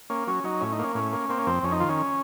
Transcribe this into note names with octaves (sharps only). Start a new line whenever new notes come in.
A#3 C#4
F#3 C#4
F#3 D#4
A2 C#4
D#4
A#3 C#4
A2 C#4
A#3
A#3 C4
C#4
F2 C4
F2 C#4
D#4
D#3 F4
C#4